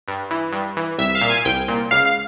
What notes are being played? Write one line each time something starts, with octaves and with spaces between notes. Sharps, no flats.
G2
E3
G2
E3
C2 E5
F5
A#2
G#5
C2 G5
A#2
C#2 F5
F5